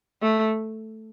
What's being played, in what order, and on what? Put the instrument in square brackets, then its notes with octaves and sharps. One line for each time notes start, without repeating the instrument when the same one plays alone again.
[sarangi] A3